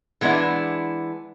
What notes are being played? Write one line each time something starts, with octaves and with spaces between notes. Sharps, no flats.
E3 G#3 B3 D4 E4